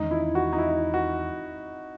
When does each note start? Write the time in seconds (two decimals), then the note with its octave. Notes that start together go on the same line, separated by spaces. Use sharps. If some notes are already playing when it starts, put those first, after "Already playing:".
Already playing: E2 D#3 G#3 C#4 D#4
0.11 E4
0.35 F#4
0.53 D#4
0.58 E4
0.94 F#4